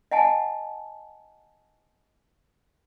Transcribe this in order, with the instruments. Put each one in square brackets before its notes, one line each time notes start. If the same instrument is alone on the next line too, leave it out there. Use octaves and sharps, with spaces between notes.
[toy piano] D#5 F#5 G#5 A5